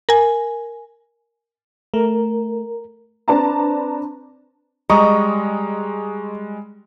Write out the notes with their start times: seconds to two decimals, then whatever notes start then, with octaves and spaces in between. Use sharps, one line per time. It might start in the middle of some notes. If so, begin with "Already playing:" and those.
0.09 A#4 G#5
1.94 A3 A#4
3.28 C4 D4 B4 D5 A5 A#5
4.90 G3 G#3 D#5 A#5 C#6 D#6